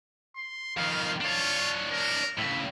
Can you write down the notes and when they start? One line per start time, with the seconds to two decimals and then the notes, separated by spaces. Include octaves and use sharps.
0.36 C6
0.77 F2 D#3 F5
1.21 D4 F4 C#5
1.92 A#4
2.38 A2 C#3 E5